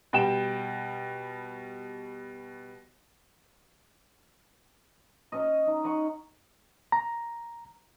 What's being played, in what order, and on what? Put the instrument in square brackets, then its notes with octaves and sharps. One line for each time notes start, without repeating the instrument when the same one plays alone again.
[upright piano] B2 G3 G5 E7
[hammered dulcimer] C#4 C#5 D#5
D#4
C#5 D#5 F#5 C#6
[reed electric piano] A#5